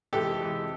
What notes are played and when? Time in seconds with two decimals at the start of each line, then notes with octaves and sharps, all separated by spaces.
0.13 F2 C3 E3 G#3 G4 A4
0.41 F2 C3 E3 G#3